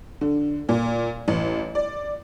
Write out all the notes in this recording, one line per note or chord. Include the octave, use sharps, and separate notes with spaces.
D3
A#2
A1
D5